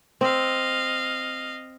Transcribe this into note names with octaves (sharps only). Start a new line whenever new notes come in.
C4 D#5 F5